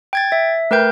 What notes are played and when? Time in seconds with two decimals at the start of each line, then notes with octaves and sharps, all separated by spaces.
0.13 G5 G#6 A6
0.32 E5
0.71 A3 A#4 B4 G5 G6